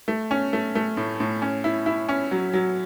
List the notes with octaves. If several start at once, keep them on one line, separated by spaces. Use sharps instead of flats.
A3
C#4
A3
A3
A2
A2
C#4
E4
E4
C#4
F#3
F#3